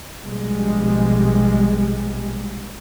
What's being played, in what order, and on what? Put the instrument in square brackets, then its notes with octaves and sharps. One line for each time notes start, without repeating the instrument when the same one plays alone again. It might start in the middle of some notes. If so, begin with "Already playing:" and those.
[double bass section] A#1 B2 G3 G#3